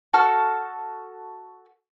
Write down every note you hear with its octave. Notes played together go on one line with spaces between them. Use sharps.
F#4 A4 A5 F6